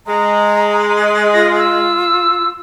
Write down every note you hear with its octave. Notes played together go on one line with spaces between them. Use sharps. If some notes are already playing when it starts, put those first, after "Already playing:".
G#3 A#5
F4 A#6
E6